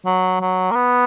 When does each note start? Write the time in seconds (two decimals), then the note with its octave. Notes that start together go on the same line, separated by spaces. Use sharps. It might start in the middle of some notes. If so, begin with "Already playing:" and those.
0.05 F#3
0.41 F#3
0.71 A#3
0.76 B3